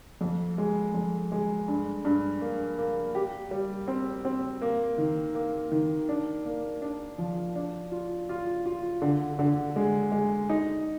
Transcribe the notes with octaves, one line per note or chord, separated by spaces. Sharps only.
F2
G#3
F2
G#3
G2
G2
A#3
A#3
G4
G3
C4
C4
A#3
D#3
A#3
D#3
D4
A#3
D4
F3
D4
F4
F4
F4
D3
D3
G#3
G#3
D#4